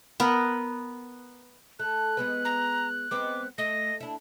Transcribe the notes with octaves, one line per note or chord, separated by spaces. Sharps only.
B3 A#4 B4
A3 F#6
G#3 B3 B4
A#5
G#3 B3 C4 D6
A3 D#5 A#6
D4 E4